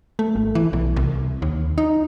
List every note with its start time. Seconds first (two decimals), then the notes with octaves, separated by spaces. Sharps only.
0.19 A3
0.36 G#1
0.55 E3
0.73 B1
0.96 C2
1.42 D#2
1.78 D#4